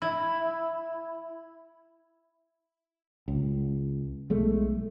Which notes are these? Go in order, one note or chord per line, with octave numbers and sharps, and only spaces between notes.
E4
C#2
B1 G#3 A3